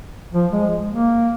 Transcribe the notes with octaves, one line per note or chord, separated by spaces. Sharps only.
F3
G#3
A#3